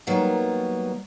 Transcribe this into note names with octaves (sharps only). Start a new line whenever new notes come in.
D#3 F#3 G3 A#3 B3